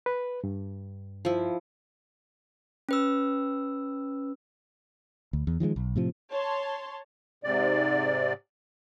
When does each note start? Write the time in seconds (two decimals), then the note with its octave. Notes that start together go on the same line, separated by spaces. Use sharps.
0.06 B4
0.44 G2
1.25 F3 E4
2.89 C#4 B4 E6
5.33 D2
5.47 E2
5.60 D#3 F3 F#3 G#3
5.76 B1
5.96 A2 C3 F3
6.31 C#5 A5 C6
7.44 G#2 C3 D5